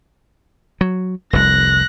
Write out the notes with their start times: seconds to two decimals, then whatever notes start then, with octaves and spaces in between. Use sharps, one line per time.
0.81 F#3
1.33 F1 C2 F#6 A#6